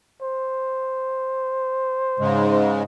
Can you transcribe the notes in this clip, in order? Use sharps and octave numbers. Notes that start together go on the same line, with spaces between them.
C5
G#2 C#3 G#3